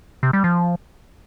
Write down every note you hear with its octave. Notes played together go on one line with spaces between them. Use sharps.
C3
G3
F3